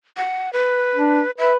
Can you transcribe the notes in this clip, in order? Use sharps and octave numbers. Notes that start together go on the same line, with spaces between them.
F#5
B4
D4
B4 E5